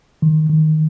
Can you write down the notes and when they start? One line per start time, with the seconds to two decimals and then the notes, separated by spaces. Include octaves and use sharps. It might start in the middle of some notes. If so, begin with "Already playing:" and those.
0.22 D#3
0.49 D#3